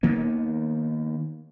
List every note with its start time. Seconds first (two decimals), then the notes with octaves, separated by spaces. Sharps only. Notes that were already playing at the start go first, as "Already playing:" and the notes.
0.03 D#3 A#3 B3